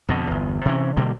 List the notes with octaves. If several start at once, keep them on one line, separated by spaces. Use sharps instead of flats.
F2 B2 D3
G1 E2
C3 E3 C#4
B2 D3 G3 A#3